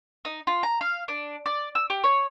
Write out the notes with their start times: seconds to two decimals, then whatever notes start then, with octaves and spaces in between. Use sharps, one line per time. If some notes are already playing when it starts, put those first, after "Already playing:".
0.25 D#4
0.47 F4
0.63 A#5
0.81 F5
1.08 D4
1.46 D5
1.75 E6
1.90 G4
2.04 C#5